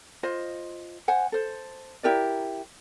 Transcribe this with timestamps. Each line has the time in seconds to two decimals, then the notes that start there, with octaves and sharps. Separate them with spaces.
0.23 F4 C5 D#5
1.08 C5 F#5 G#5
1.32 A4 C5
2.03 E4 G4 A#4 D5